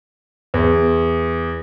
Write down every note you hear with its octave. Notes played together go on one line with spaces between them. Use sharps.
E2